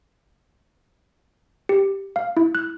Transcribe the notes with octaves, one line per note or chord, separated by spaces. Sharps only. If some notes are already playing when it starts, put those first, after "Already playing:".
G4
F5
E4
F#6